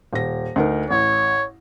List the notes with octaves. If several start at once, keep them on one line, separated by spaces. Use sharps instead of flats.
D#1 A#6
D2 D#4 A#4
A1 C#5